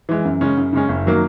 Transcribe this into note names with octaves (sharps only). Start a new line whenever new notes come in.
E3 G#3
F#2
C#3 G#3 C#4
F#2
C#3 G#3 C#4
F#1
D#3 F#3 A#3